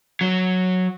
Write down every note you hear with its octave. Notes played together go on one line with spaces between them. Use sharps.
F#3